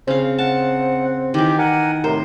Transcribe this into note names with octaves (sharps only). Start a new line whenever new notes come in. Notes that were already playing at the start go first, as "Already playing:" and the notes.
C#3 C4 F5
F#5 A5
D#3 E3 G4
A#4 F#5 G#5
A2 C3 A#4 C5